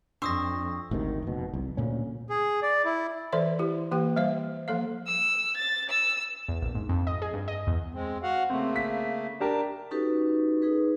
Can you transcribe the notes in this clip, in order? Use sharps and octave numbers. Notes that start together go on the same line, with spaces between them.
F2 D4 C6 C#6 D#6 E6 A#6
G#1 D2 C3 D#3
F1 B2
C2
D2 A#2 C#4
G#4
D5
E4
E3 A4 C5 D5 E5
E4 G4
E3 A#3 G4 G5
G3 C5 F5
F3 A#3 A4 F5
E6
A6
E6
E2
A#1
G#2
F2
D#5
G#4
G2
D#5
E2
G#3 C4
F#4 F5 F#5
C#3 A3 A#3 C4
B6
D4 G4 A#4 A5
C#4 D#4 F#4 G4 A4 B4
D#4 G#4 B4